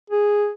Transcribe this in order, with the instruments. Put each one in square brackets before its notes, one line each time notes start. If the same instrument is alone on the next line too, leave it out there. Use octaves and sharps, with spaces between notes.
[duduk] G#4